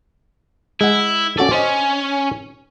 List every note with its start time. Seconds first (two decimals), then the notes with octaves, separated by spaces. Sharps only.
0.81 G#3 E4 F#5
1.39 C#4 F#4 A4 D5
1.51 C#4 C5 D#5